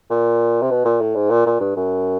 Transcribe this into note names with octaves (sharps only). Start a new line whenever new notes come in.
A#2
C3
B2
A#2
A2
G#2
A#2
A#2
G2
F#2